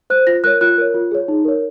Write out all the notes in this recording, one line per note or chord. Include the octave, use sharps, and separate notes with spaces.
C5 F#6
F4 A#6
A#4 C#5 F#6
F4 F#6
A#4 C#5
F4
G#4 C#5
D#4
A#4 C#5